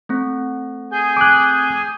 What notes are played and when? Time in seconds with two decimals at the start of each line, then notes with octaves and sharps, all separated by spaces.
0.09 A3 C4
0.92 G#4 G#5 G6
1.17 D6 F#6